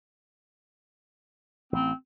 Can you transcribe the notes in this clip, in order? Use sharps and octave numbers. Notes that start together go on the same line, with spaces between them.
A1 C4